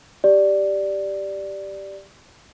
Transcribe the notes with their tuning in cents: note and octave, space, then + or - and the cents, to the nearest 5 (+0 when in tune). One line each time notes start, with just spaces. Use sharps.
G4 +0 D5 +0